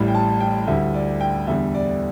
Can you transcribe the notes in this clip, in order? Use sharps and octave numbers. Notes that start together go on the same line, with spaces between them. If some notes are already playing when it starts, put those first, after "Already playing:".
Already playing: A1 A2 G3
G5
A5
G5
D2 D3 G3 E5
D5
G5
E2 D3 G3 E5
D5